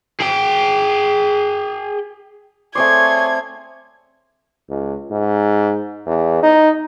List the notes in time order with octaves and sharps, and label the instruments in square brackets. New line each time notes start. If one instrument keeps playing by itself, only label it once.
[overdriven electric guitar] G#4 G5
[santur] A3 C4 D5 [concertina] G#4 C#5 C6 [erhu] G#6
[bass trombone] C#2
G#2
E2
D#4